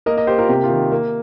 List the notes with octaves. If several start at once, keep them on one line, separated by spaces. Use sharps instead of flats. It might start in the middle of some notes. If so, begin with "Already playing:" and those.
A#3 A#4 D#5
A#4 D#5
A#3 G4 C5
F4 A#4
C3 G4
F4
D#3
A#3